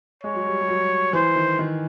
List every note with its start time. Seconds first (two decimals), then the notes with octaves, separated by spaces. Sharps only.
0.24 G#3 C#5
0.35 F#3
0.46 G3
0.61 G3
0.68 F#3
1.13 E3 C5
1.36 D#3
1.59 D#3